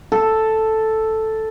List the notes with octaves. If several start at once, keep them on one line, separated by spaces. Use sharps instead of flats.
A4